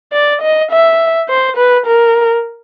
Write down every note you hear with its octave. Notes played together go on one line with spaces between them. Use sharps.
D5
D#5
E5
C5
B4
A#4